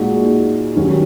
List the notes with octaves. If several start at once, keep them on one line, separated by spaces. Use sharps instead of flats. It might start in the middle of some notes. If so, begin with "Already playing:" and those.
Already playing: A#2 G#3 D#4 F#4
D#2 D#3 F#3 C#4